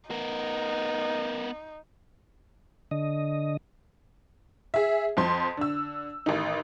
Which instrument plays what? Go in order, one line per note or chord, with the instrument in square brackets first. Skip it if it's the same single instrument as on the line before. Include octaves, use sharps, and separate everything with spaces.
[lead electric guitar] B3 A#4 [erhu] D#4
[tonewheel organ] D3 D#5
[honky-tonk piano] G#4 E5
F2 F3 C6
D3 E6
A1 D#3 D#4